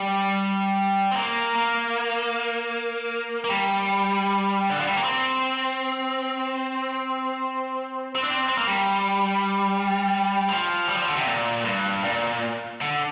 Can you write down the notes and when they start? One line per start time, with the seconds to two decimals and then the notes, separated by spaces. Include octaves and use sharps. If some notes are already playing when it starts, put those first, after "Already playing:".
Already playing: G3
1.12 C4
1.16 A#3
1.55 A#3
3.44 A#3
3.49 G3
4.70 D3
4.79 F3
4.87 G3
4.96 A#3
5.04 C4
8.15 C4
8.23 D4
8.30 C4
8.49 C4
8.58 A#3
8.67 G3
10.49 F3
10.89 G3
10.97 F3
11.08 D3
11.16 C3
11.27 A#2
11.65 G2
12.04 A#2
12.81 D3